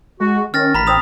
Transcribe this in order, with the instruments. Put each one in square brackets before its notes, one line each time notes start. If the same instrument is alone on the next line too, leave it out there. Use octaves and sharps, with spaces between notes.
[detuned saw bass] G#3 [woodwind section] F#4
[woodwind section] D#3 [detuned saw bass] C#4 [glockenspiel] F6 A6 A#6
[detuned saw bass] A1 [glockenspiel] A#5 B5 B6
[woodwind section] C4 [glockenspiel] D#6 F7